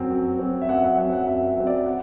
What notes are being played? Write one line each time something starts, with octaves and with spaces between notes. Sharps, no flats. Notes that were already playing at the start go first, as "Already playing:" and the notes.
Already playing: F#2 F#3 C4
F#2
F#3 C4
E5
F#2 F#5
F#5
F#3 C4 F#5
F#5
F#2 E5
E5
F#3 C4
D5
F#5